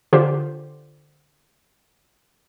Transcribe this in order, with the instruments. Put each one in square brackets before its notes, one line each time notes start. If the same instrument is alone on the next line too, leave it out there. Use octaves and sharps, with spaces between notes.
[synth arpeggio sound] D3 F4 G4 C5